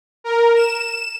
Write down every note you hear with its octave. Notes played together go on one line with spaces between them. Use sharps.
A#4
E7